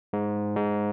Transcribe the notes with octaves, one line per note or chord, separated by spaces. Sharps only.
G#2
G#2